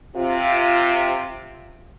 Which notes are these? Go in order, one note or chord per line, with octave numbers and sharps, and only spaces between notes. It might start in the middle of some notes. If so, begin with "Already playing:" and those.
C3 F4